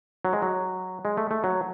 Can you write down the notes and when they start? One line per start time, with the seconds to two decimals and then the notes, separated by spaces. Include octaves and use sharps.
0.25 F#3
0.33 G#3
0.42 F#3
1.05 G#3
1.17 A3
1.31 A3
1.44 F#3